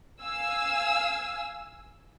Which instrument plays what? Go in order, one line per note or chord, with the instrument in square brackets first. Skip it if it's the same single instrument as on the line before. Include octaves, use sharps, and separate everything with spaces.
[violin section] F5 G#5 E6